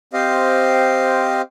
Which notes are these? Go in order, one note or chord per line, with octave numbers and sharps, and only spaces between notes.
C4 G4 C5 D#5 F5